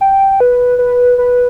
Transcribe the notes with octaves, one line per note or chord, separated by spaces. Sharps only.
G5
B4
B4
B4